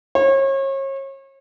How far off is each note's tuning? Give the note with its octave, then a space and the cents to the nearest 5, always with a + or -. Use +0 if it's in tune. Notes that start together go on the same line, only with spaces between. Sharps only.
C#5 -35